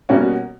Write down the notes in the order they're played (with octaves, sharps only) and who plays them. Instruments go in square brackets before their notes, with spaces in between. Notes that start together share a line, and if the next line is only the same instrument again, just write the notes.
[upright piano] B2 G3 A#3 C#4 F#4